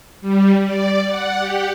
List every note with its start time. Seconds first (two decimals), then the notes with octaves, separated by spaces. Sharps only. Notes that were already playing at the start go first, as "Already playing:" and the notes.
0.21 G3
0.64 D5
1.07 F#5
1.39 G4